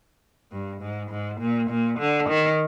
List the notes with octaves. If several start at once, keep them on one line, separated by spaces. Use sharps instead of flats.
G2
G#2
G#2
A#2
A#2
D3
D#3